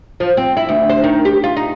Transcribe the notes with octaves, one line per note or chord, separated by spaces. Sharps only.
F3
C4
E4
D2
C5
D#3
G4
F4
D#4